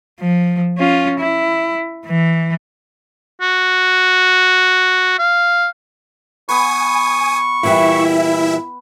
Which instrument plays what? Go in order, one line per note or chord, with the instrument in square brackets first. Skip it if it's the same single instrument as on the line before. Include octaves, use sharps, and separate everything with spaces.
[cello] F3
C#4 F4
E4
E3
[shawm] F#4
F5
[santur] B3 B4 [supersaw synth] G#5 D#6 [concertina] C#6
[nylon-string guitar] A#2 E3 G3 [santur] B3 [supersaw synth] E4 E5